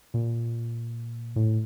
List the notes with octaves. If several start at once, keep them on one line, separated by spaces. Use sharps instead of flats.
A#2
A2